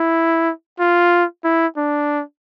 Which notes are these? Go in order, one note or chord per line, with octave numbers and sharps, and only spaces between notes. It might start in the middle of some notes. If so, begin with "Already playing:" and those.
Already playing: E4
F4
E4
D4